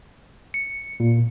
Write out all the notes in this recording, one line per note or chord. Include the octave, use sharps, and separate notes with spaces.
C#7
A#2